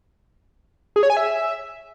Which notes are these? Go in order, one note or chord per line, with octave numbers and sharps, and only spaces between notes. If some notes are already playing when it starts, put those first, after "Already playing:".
G#4
C#5
G#5
E5